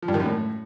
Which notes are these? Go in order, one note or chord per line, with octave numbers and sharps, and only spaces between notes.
F3
G2
D#3
F#2
A2